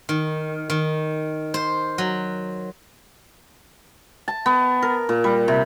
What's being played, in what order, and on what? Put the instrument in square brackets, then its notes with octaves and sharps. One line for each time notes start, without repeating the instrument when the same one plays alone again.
[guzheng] D#3
D#3
C5
F#3
[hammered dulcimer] A5
B3
A#4
A#2
G3
C3